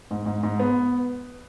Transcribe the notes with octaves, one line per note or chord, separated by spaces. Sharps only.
G#2
G#2
G#2
B3